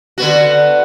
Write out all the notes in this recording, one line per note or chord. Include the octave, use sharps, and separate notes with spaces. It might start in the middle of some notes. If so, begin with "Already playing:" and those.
D3 B3 F#4